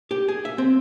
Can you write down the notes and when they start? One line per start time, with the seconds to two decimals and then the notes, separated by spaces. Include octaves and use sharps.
0.11 G4
0.28 G#4
0.45 E5
0.58 C4